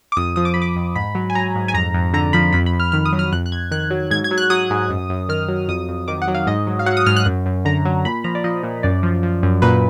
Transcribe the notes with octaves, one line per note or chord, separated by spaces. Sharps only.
D6
F2 D#6
F3 D#6
D6
F3 B5
D6
F2
G#2 B5
F#3
G#5
F#3 A#5
G#2
G#5
F2 A#5
F2
D3 A#5
F3 B5
F2 B5
B5
F2
F6
D#3 F6
D#6
F#3
F6
F2 F#6
F#6
F2 G#6
D#3 F#6
F#3
G#2 G#6
G#6
F#3
F#6
F#3 D#6
G#2
F#2
F#2
D#3 F6
F#3
F2 D#6
F2
D#3 D6
F#5
F#3
F5
G#2 D#5
F#3
F5
F#3 F#5
D#6
G#2 F6
F#6
F#2
F#2
D3 A#5
F#3
A#2 B5
F3 A#5
D5
F3 D#5
A#2
F#2 D5
F3
F3
F#2
A#2 B4